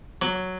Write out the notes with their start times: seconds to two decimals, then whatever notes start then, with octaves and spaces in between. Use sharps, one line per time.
0.22 F#3